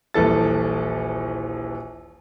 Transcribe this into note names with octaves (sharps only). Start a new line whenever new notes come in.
D#1 A#1 E3 A4 A6